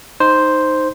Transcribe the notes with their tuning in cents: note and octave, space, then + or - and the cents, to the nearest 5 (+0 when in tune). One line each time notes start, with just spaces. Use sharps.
D#4 +0 C5 +0